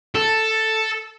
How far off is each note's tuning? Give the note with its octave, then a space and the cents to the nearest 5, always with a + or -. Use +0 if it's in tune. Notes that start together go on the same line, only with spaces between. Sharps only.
A4 +5